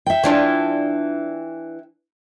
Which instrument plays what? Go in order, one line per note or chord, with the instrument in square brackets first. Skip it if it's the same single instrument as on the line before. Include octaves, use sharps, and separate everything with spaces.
[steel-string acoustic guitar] E5 G5
[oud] E3 D4 F4